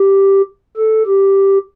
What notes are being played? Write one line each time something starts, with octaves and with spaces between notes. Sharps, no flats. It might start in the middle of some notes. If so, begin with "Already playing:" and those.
Already playing: G4
A4
G4